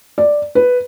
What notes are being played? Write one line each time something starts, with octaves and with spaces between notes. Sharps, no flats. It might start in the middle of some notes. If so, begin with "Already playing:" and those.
D5
B4